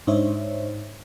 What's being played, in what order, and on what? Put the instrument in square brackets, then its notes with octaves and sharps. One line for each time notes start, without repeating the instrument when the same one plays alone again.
[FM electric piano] G#2 D4 D#4 C5 C#5 E5